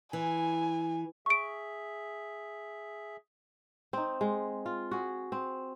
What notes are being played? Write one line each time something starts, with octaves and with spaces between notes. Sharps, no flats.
E3 G#5
G#4 E5 C#6 D7
C4 D#4
G#3
F4
F#4 G#4
C4